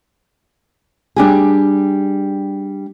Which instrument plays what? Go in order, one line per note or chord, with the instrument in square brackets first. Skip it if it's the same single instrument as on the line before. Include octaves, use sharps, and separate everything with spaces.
[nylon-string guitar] G3 D4 G4 G#4